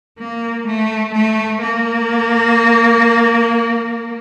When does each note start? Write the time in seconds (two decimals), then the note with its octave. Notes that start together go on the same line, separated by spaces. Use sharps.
0.19 A#3
0.67 A3
1.14 A3
1.61 A#3